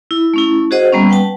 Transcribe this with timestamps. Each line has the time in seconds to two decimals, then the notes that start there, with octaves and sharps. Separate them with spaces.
0.11 E4
0.34 A3 C#4 E4
0.71 F#4 G#4 C5 D#5 F#5
0.92 G3 A#3 B3 C#4
1.09 B4 F#5 G5 A5